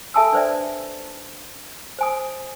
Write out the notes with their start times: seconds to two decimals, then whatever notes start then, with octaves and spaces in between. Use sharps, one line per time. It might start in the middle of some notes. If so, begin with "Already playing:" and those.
0.14 A4 E5 G#5 A5 D#6 E6
0.33 D4 B4 C5 D5 E5
1.99 C5 G#5 D#6